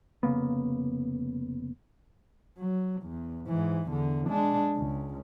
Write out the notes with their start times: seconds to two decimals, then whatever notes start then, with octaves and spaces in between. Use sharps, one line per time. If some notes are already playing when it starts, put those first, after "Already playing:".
0.23 F1 C#3 A#3 B3
2.58 F#3
3.02 E2
3.48 G#2 E3
3.90 E2 D3
4.28 G#3 D4
4.76 C#2